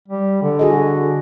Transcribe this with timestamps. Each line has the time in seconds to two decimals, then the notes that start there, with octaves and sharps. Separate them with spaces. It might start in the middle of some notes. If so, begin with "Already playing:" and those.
0.08 G3
0.43 D3
0.59 F#4 G#4 D#5